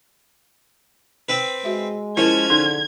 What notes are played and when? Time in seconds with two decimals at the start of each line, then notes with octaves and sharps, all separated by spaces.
1.29 C4 B4
1.65 G#3 F#4 E5
2.17 F3 C#4 E4 A#4 G#6
2.50 D3 D#4 G#4